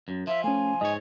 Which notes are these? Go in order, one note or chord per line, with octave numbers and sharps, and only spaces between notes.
F#2
F3 E5
A3 C#4 G#5
G#2 C#5 D#5